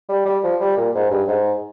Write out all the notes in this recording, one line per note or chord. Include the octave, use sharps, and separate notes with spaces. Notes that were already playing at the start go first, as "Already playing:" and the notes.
G3
G3
F3
G3
A#2
G#2
G2
G#2